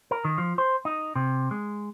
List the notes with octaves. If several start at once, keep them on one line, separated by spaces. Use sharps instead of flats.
A#4
D#3
F3
C5
D#4
C3
G#3